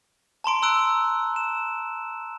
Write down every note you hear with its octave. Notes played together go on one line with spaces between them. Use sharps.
A5 A#5 C6 D7
A#5 C6 E6 F#6 D7
E7